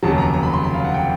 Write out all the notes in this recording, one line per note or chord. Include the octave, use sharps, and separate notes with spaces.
F1 D#2 C#3 F#3 A5
A#5
A#5
B5
C6
B5
F5
F#5
G5